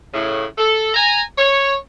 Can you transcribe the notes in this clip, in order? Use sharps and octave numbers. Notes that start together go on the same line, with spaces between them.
A2 C#3
A4
G#5 A#5
C#5